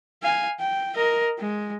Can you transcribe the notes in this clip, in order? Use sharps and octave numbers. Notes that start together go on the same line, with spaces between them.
F5 G#5
G5
A#4 D#5
G#3